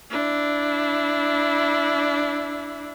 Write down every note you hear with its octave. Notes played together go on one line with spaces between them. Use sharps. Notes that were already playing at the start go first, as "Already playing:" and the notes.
D4 E4